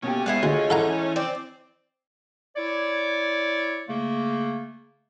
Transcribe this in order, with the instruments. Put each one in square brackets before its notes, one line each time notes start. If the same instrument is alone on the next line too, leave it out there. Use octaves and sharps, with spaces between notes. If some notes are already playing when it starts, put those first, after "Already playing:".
[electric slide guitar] B2 A#3 G4 [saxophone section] D3 A3 C#4
[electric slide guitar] G#3 B3 [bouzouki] E4 F5 F#5
[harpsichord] D2 [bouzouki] G#3 [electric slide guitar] F4 C#5
[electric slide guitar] E3 [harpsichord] A4 F#5 A#5
[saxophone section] C4 [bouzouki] D5
[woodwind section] E4 C#5 D5
C#3 A3 A#3